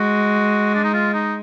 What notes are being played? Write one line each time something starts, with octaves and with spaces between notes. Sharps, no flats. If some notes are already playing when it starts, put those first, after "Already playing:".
Already playing: G#3 F#4
D4
D#4
F4
D#4